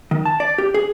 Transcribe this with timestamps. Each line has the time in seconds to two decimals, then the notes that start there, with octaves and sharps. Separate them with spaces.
0.11 D#3
0.25 A5
0.40 D5
0.58 G4
0.74 G#4